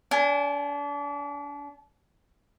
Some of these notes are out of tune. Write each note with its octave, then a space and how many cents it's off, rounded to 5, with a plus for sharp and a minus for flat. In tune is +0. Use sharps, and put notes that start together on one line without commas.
D4 -35 G#5 +0